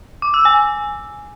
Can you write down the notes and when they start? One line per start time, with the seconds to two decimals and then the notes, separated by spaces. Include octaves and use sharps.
0.22 D6
0.34 E6
0.45 G#5